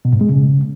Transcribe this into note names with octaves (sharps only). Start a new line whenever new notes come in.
B2
G#2
G#3
C#3